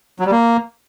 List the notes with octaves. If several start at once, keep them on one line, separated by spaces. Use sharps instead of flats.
F#3
G3
A#3